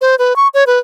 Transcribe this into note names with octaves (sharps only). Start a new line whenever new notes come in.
C5
B4
C#6
C#5
B4